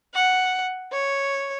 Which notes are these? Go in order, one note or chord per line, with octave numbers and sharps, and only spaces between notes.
F#5
C#5